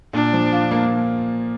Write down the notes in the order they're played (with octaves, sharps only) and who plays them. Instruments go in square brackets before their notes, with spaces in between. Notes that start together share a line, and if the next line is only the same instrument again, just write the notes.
[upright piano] A#2 [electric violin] D4
[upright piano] F3
F4
A#3